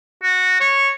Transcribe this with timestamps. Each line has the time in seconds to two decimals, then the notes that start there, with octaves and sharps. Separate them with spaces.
0.23 F#4
0.61 C#5